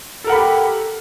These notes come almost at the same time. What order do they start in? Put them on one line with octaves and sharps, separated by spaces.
A4 A#4 F#5 B5 G4